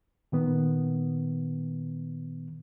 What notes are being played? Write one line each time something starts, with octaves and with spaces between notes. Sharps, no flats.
A#2 D#3 B3